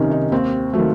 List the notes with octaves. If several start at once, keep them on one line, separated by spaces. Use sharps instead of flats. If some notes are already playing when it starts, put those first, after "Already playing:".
Already playing: C2 C3 D#3 C#4 D#4
D#4
D#2 C4
D#3 F#3 A3